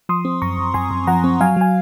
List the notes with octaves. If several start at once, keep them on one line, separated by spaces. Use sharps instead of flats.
F3 C6 D#6
C4
F#2 A#5 C#6
F#2
F#2 G#5 C6
F#2
F3 F#5 A#5
C4
F#3 F5 G#5
F#3 G#5